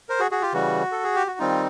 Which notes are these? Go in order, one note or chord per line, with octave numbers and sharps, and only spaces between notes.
A#4 C5
F#4 G#4
F#4 G#4
F4 G4
C#3 E3 G3 F#4
A4
G#4
G4
F#4
D#3 G3 C4 D#4 F4